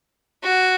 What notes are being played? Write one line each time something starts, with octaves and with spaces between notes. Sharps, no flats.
F#4